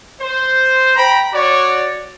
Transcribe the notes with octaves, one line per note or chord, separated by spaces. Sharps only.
C5
G5 A#5 B5
F#4 C#5 D5